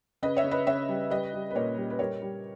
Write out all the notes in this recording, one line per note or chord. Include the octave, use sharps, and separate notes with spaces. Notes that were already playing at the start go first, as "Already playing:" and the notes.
C#3 B4 D#5
C#5 E5
C#3
B4 D#5
C#3 C#5 E5
G3
G3 B4 D#5
G3
B4
A#2 A#4 C#5
G3
B4
G3 A#4 C#5
G3